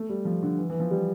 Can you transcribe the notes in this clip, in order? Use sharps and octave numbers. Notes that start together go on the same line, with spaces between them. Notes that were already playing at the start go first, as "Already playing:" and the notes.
Already playing: A3
G3
F3
D3
E3
E3
F3
G3